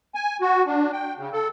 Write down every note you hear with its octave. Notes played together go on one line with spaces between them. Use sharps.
G#5
F#4
D4
G5
C#3
A4